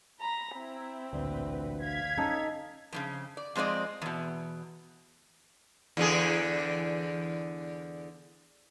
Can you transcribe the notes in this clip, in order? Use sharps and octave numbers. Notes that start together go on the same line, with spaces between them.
A#5 B5
C4 E4
A1 D2 A#2 B4
F5 G#6 B6
C#4 D#4 A4
F2 A2 C#3
D5
F2 G#3 C4 D5 D#5
E2 B2
E2 D3 G#4